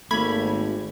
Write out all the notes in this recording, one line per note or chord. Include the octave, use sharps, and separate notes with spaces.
G#1 A3 A#3 B5 G#6